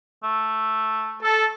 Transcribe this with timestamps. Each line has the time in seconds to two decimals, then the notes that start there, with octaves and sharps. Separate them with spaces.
0.23 A3
1.22 A4